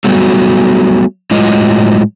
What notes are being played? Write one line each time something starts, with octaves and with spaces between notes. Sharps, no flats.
F#3 G3 A3 B3 F#4
A2 F#3 G#3 F4 D#5